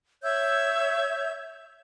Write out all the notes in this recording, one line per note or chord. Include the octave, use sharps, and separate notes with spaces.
C#5 E5 E6 G6